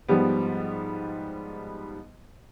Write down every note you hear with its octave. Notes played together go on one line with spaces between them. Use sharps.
G#2 F3 G3 B3